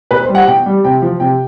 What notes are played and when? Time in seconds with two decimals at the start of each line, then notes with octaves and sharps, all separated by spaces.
0.11 B2 B4
0.23 C5
0.29 G3
0.35 F#5
0.47 B2 G5
0.66 G3
0.84 C3 G5
1.02 F3
1.20 C3 G5